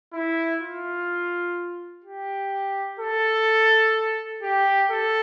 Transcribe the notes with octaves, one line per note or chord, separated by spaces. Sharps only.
E4
F4
G4
A4
G4
A4